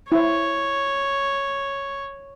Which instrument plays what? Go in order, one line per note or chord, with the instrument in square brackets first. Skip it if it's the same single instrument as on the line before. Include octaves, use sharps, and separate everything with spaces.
[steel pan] E4 C5 [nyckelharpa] C#5